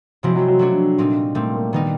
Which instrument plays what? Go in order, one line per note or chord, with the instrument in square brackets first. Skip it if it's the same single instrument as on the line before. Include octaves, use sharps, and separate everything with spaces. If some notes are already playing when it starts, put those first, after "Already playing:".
[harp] C3 F3 G#3 C4 E4 [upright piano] F#3
[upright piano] F#3
F#3
[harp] F#3 A3 D4 F#4
A#2 G3 C4 D#4
[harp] A#2 G3 C4 [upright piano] A3
[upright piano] A#3
[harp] D#3 G3 A#3 D#4 [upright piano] B3